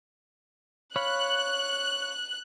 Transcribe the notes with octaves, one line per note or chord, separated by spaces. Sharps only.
C#5 F5 B5 F#6